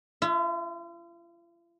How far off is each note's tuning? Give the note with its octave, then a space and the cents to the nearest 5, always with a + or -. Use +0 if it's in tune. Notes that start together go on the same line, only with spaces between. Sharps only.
F4 -45 E5 +0